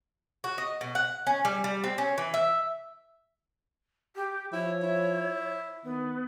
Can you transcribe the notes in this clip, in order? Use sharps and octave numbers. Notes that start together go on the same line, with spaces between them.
F#4
D#5
B2
F#5
C#4
G3
G3
C4
C#4
E3
E5
G4
F3 E4 C#5
E4
D#3 B3